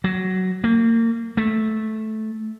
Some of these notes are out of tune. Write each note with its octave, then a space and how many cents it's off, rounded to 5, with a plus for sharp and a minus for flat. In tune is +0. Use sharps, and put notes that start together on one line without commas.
F#3 +10
A#3 -30
A3 -10